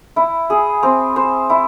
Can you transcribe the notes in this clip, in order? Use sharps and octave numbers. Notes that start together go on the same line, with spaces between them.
E4
G#4
C4
C5
E4